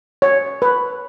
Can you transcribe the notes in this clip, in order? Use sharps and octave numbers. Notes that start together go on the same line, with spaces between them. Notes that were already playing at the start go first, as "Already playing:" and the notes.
C#5
B4